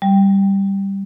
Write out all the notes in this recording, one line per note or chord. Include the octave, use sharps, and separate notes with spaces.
G3